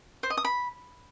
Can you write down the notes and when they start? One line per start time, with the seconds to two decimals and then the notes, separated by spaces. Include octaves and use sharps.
0.23 C5
0.30 D#5
0.37 D#6
0.45 B5